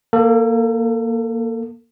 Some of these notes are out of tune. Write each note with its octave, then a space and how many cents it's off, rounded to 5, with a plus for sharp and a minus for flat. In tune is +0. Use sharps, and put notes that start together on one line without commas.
A#3 +0 A4 +30